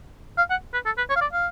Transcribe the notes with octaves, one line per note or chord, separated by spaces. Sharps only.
F5
F#5
B4
A4
B4
C#5
F5
D5
F5